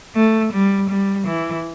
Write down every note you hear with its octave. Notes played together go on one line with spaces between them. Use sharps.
A3
G3
G3
E3